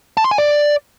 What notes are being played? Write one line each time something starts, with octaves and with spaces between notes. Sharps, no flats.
A5
C6
G#5
D5